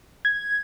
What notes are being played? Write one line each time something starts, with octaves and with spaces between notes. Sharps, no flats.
G#6